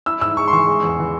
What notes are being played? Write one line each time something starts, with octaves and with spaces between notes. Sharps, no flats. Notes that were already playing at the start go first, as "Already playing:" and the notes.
E4 E6
G#2 E6
G#3 C#6
C6
E3 C#6
G#3
E2
E3